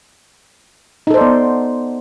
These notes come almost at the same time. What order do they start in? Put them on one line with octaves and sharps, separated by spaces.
D#4 A4 C5 D5 B3